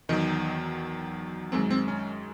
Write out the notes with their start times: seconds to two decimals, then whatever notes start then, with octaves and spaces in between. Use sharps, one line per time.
0.09 E2 D#3 F#3 D#4
1.52 F#2 D#3 G#3 C4
1.70 C4
1.88 C#4